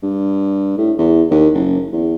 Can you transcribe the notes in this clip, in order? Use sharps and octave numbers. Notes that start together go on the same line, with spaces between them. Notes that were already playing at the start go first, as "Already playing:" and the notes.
G2
A2
E2
D#2
F#1
E2